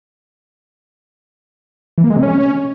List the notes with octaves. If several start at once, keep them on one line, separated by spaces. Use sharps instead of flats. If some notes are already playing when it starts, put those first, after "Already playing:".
E3
A#3
G#3
C3
C#4